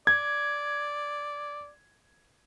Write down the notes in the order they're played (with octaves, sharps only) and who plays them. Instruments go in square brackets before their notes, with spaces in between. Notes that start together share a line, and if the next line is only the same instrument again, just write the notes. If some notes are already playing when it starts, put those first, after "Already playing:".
[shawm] D5 [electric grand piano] G#6